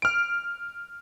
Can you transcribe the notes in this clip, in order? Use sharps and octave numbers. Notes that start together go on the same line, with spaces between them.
F6 D7